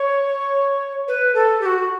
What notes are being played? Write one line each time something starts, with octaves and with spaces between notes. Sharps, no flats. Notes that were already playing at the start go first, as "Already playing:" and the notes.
Already playing: C#5
B4
A4
G4
F#4